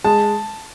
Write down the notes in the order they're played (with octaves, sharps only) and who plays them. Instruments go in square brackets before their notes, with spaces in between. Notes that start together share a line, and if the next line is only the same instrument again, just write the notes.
[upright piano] G#3 [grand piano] A5